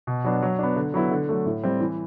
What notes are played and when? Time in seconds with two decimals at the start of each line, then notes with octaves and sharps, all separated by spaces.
0.07 B2
0.24 F#3 B3 D4
0.42 F#3
0.59 B3 D4
0.76 D3
0.94 F#3 B3 E4
1.11 D3
1.29 F#3 A3
1.46 A2
1.63 G3 C4
1.81 E3